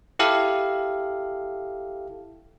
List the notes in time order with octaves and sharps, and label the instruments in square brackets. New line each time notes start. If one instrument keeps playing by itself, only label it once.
[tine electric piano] E4 G4 A4 F5